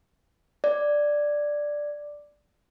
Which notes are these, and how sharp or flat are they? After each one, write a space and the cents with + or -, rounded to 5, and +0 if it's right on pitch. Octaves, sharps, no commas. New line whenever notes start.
D5 +0